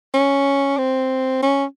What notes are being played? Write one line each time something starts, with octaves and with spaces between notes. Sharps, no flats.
C#4
C4
C#4